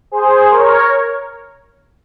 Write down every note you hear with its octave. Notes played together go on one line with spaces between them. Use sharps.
G#4 C5
A#4 C#5